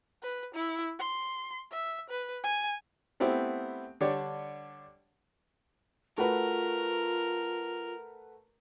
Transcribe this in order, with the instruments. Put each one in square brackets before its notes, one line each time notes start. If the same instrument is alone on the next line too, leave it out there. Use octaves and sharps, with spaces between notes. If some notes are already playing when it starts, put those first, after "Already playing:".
[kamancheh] B4
E4
C6
E5
B4
G#5
[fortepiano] A3 B3 C4 E4 G4
D3 G3 D4 G4 C#5 D5
[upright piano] A3 F#4 B4 [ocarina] F4 [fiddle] A#4